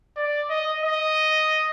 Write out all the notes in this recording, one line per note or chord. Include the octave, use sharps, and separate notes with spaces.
D5
D#5
D#5